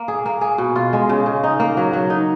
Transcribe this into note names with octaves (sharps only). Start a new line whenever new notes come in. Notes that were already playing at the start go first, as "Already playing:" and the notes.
Already playing: A#3
G#4
A#3
G#4
B2
F4
G#3
C#3
C#3
D#4
A#3
F#3
F#3
D#4